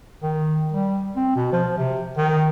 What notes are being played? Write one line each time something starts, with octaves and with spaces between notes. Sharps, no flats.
D#3
G3
C4
B2
F3
C3
D#3